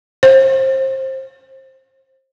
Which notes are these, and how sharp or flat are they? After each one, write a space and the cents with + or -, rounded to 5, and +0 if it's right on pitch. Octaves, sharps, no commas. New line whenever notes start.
C5 +25